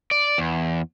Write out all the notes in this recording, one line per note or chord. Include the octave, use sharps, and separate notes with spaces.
D5
E2